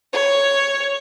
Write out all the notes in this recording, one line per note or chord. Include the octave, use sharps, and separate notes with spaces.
C#5